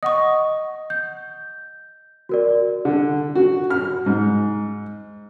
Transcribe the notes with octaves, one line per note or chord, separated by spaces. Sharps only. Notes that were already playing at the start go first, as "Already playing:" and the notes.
D#5 F#5 C#6 D#6
G6
F#4 A#4 D5
D3
F#4
F6
G#2